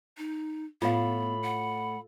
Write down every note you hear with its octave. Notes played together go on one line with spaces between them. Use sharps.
D#4
A2 B3 F4 F5 B5
F#5